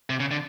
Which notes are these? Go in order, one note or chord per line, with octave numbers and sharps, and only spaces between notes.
C3
C#3
D3